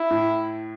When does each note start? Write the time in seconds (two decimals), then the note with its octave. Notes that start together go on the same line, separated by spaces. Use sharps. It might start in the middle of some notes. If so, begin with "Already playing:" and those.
Already playing: E4
0.10 A2